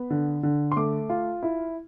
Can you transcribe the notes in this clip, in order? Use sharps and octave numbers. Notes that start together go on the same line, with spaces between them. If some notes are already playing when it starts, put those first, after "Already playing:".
Already playing: B3
D3
D3
C6
A3 D6
F4
E4